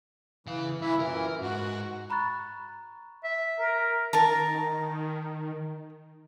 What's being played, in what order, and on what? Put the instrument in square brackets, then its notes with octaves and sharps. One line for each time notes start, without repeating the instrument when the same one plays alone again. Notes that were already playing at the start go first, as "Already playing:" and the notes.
[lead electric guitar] C#3 F5 [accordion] E3
[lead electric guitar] C2 E5 [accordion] E3 E4
[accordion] F#2 A#2 E3 [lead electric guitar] A#4
[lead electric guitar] G#2 [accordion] F#4
[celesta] A#5 B5 C#6 F#6 A6
[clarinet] E5
[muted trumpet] A#4
[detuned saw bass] D#3 [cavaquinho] A#4 A5 A#5